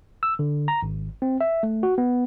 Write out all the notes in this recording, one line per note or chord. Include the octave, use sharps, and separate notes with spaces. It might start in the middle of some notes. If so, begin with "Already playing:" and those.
E6
D3
A#5
G#1
C4
E5
A3
F#4
B3